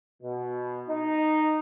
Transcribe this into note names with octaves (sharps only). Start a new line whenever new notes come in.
B2
D#4